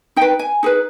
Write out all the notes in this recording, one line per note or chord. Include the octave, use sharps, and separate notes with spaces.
D#4 B4 G5
G#5
D#4 G#4 B4